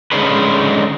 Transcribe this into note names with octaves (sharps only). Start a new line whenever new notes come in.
D3 G#3 C#4 D#4 G#4 B4